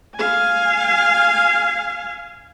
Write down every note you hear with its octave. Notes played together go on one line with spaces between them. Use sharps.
F5 G#5